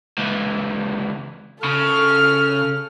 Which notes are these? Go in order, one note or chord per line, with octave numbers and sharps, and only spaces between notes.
C#2 E3
C#3 A4 F6